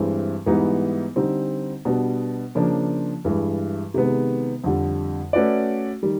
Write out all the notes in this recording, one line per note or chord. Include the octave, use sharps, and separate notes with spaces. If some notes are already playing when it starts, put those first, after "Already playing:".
Already playing: G2 E3 G#3 C4
G#2 E3 G3 B3 D#4
D3 G3 C4 D#4
B2 G3 B3 D4
C#3 F3 A#3 D4
G2 E3 G#3
C3 D#3 G#3 B3
F2 D3 G3
A3 C#4 F#4 B4 D5
D#3 G3